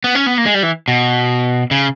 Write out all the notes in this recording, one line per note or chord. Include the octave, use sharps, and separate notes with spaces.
B3
C#4
B3
A#3
G#3
G3
E3
B2
C#3